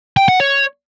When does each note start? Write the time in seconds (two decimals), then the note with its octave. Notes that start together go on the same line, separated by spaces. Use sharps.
0.17 G5
0.28 F#5
0.40 C#5